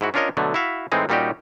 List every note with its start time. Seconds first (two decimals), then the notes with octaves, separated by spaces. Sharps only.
0.01 G#2 E4 F#4
0.14 C#4 D4 F4 A#4 C#5 D#5
0.37 B2 D3 F#3 A3
0.54 E4 F#4 E5 F5
0.92 A2 E3 G#3 C4 D#4 G#4
1.09 A#2 G3 C#4 D#4 F#4 G4